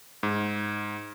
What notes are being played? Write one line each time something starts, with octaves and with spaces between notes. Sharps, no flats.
G#2